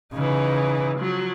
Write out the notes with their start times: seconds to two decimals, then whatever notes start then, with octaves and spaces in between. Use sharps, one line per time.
0.13 C#3 E3 D#4
0.98 F3 F#3